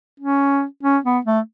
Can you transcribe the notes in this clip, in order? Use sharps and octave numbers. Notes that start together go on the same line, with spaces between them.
C#4
C#4
B3
A3